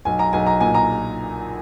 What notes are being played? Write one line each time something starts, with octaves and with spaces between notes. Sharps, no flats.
B1 G#5
A#5
B1 G#5
A#5
A#2 G#5
A#5